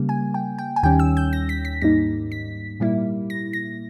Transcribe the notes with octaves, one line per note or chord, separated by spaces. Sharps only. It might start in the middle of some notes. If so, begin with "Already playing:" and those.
Already playing: C#3 G3 A#3
G#5
G5
G5
G#5
D#2 D#3 G3 C#4 G5
E6
G6
A#6
B6
B6
G#2 G3 A#3 D#4 A#6
B6
A#2 G3 A#3 E4
A#6
A#6